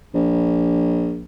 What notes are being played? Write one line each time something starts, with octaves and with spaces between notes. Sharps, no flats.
A#1